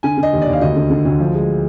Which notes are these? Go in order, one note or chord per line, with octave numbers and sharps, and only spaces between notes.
D3 G#5
D3
D#5
D#2
D5
D#2
F5
D2 D#5
D3
D3
D2
F3
G#3